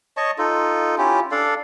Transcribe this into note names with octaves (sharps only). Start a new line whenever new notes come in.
C#5 D#5 A5 C#6
D#4 F4 A4
C#4 E4 F4 G4
D4 A4 D5 F5